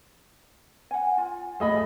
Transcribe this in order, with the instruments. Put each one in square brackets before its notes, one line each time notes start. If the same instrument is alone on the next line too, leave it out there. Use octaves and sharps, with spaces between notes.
[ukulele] F#5 G#5
F4
[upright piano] A3 D#5 B5 [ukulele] G#4